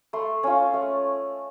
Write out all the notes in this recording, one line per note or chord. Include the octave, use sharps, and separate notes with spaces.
A3 C6
C#4 F4
A3